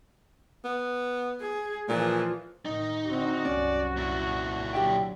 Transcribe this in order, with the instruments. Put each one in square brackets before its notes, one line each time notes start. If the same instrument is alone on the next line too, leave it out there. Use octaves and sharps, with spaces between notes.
[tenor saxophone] B3
[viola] G#4
[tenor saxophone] A#2 [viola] E3 F3
[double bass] A2 D#3 [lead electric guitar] D#4
[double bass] D3 C4 [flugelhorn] F#4
[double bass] C2 F#2 [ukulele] C#4 [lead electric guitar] D5
[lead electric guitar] A#2 E4
[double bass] D3 F#3 [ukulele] G4 E5 G5